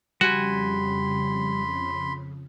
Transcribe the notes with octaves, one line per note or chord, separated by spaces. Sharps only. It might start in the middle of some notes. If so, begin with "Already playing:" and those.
F2 C#3 G3 F#4 G#5 B5 C6